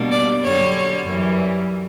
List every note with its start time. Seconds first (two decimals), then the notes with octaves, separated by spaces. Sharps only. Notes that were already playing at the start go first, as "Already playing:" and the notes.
Already playing: B2 G3 A#3 D4
0.11 D5
0.43 F#2 D3 G3 C#5
1.05 F#2 E3 G3